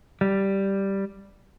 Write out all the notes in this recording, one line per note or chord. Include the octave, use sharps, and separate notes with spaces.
G3